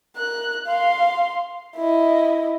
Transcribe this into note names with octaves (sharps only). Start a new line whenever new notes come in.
A#4 F#6
F5 C6
E4 D#5